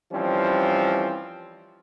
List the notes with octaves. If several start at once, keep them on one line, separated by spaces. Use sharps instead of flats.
E3 F3 G3 C4 C#4